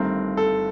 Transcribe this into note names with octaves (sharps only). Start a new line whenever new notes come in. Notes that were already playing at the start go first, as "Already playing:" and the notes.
Already playing: G1 G2 D#3 A3 C4 A#4
A4